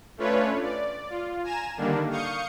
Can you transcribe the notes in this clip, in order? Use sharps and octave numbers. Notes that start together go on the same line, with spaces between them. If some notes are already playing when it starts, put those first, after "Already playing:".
A3 C#4 D4 F4 B4 C#5
D5
F4
G#5 A#5 E7
D3 D#3 G3 A#3 D4
F5 C#6 D#6 G6 C#7